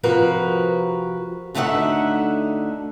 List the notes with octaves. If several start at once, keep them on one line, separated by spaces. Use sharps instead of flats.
C3 F3 F#4 A#4 B4
D2 D3 A3 D#4 E5 F#5